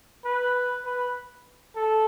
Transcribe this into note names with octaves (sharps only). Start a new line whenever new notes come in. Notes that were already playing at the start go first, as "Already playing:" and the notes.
B4
B4
A4